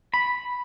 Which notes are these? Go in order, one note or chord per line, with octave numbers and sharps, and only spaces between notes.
B5